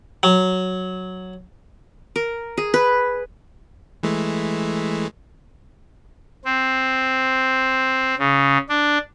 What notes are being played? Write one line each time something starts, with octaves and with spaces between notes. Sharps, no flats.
F#3
A#4
G#4
B4
E3 G#3 A3
C4
C#3
D4